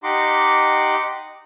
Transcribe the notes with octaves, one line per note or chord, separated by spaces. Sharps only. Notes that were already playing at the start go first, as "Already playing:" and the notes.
D#4 G4 D#5 F#5 C6 D6